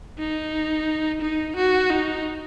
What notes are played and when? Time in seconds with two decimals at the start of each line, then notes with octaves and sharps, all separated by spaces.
0.19 D#4
1.22 D#4
1.56 F#4
1.90 D#4